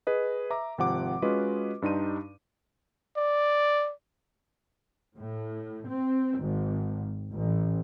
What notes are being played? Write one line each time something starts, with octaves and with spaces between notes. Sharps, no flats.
G#4 B4 D#5
E5 A#5 D6
G#1 C3 F3 F#5 D6
G#3 C#4 F4 F#4 B4 D#5
G2 D4 D#4 G4 C6 D#7
D5
A2
C4
G#1
A1